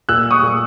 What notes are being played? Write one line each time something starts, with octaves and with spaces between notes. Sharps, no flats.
A#2 E6 F#6
C#6 D#6
A#2